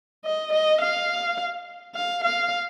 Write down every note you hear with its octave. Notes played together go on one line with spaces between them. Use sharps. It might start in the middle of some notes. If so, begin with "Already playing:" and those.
D#5
D#5
F5
F5
F5